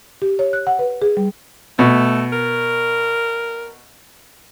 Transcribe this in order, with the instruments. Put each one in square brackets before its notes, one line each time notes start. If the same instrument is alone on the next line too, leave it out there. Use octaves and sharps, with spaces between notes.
[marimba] G4
C#5
F#6
F#5
B4
G#4
G3
[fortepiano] B2 [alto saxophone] A3
[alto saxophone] A#4